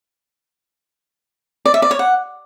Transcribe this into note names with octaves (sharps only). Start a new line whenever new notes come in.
D5
E5
D5
C#5
F#5